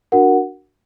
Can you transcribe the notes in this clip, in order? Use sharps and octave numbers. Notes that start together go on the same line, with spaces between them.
D4 F#4 A#4 F#5